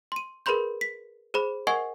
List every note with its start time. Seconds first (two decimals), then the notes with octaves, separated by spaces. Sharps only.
0.12 C6 D#7
0.46 G#4 A#4 B4 B5 C6 G6
0.81 B6
1.34 G#4 C5 B5
1.67 A#4 D#5 F#5 G#5 C#6 G#6